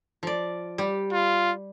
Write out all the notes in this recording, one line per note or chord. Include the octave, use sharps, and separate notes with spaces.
F3 D5
G3 G4
F4